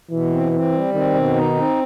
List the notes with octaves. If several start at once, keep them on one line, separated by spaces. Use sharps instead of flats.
B2 E3
C4
C4
G3
D#3 C4
B2
D#4
C4